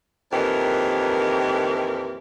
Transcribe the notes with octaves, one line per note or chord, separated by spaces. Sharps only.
F2 A#2 D#3 E3 G4 A#4